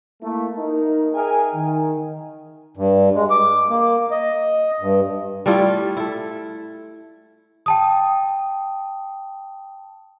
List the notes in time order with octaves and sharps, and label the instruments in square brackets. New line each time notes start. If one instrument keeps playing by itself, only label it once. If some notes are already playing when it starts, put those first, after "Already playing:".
[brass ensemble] A3 A#3 E4
D#4 A#4
G#4 A#4 E5 G5 G#5
D#3
[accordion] G2
G#3
D6
A#3
D#5
G2
[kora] G3 A3 E4 F4
F4
E4 A4
[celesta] G5 A5 D#6